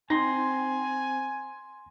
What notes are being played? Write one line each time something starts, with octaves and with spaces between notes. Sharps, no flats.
C4 D#4 G#5 C6 A#6